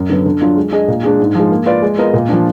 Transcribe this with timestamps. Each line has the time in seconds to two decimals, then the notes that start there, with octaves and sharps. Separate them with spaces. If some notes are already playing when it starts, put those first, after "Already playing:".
Already playing: F#2
0.10 D3 F#3 B3
0.26 D3
0.41 F#3 D4 F4
0.57 G#3
0.72 D4 G#4 D#5
0.88 A#2
1.03 G#3 D4 G#4
1.19 G#2
1.35 F3 G#3
1.51 A#3
1.66 F4 B4 D5
1.82 G#3
1.98 B3 F4 A#4 D#5
2.14 A#2
2.29 F3 A#3 D4